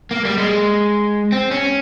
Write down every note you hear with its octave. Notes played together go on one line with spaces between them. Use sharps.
A#3
G3
G#3
C4
C#4